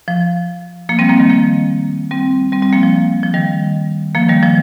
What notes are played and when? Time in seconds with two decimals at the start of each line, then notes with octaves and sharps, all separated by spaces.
0.08 F3
0.89 F3 A#3
0.99 G3 C4
1.09 F3 A#3
1.19 D#3 G3
1.30 F3 A#3
2.11 G3 C4
2.52 G3 C4
2.62 G3 C4
2.73 F3 A#3
2.83 F3
3.23 F3
3.34 D#3 G3
4.15 F3 A#3
4.29 D#3 G3
4.42 F3